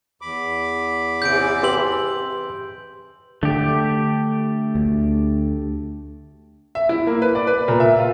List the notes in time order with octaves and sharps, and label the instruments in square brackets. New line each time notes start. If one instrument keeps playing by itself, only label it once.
[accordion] E2 B5 D6
[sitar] G#2 C3 E3 [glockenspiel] G6 D7
[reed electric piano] G4 B4 E6 [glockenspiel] C6 F#7
[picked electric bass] D3 [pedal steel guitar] A3 G4
[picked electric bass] D2
[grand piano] E5
E4
A#3
B4
D5
B4
A#2
E5
F4